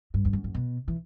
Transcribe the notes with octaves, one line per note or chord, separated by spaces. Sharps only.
G2
E2
F#2
A2
B2
E3